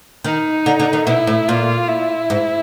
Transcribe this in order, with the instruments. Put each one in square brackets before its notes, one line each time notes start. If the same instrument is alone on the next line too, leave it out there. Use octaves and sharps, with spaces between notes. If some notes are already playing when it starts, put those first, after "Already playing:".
[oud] D#3 [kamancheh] D#4
[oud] D3
D3
D#3
[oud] B2 [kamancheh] E4
[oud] A2
[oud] A#2 [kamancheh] F4
[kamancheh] E4
[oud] G#2